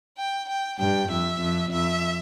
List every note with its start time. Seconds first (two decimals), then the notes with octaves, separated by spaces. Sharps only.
0.18 G5
0.49 G5
0.79 G2 G5
1.10 F2 E5
1.41 F2
1.71 F2 E5